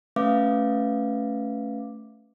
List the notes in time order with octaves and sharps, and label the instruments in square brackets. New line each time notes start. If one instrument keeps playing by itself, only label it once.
[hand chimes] A3 C#4 B4 E5 F5 D6